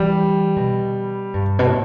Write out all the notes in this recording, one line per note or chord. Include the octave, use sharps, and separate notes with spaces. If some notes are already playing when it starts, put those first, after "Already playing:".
Already playing: E3 G3
B2
G2
B2
A2